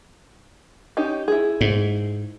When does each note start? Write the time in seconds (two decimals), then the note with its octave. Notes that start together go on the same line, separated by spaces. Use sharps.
0.97 C#4 D#4 G4
1.28 E4 G#4
1.61 G#2